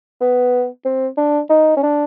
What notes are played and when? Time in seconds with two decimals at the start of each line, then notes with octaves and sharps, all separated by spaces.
0.21 B3
0.85 C4
1.17 D4
1.50 D#4
1.77 C#4
1.83 D4